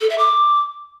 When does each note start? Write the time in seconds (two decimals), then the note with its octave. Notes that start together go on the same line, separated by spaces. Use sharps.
0.01 A4
0.10 E5
0.18 D6